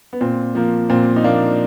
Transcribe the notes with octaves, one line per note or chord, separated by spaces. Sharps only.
B3
A#2 C4
F3 A#3
A#2 C4
D#4
F3 A#3 D4